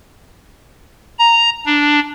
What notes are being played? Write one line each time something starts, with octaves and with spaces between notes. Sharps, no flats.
A#5
D4